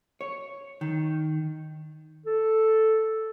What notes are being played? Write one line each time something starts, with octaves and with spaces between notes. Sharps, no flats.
C#5
D#3
A4